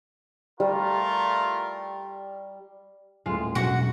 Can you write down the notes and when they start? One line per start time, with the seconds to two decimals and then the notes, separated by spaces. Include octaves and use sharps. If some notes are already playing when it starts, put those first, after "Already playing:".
0.60 G3 A3 F4 A#4
3.26 D#1 A2 G#3 F4
3.55 E1 F#2 B2 F#4 F#5